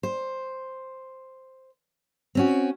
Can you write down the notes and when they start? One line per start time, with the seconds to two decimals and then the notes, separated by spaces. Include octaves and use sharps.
0.03 C5
2.35 C4 C#4 F#4